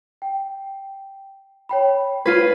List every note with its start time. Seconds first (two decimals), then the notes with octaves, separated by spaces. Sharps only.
0.22 G5
1.69 C#5 G5 B5
2.26 F4 B4 G#6 C7 D#7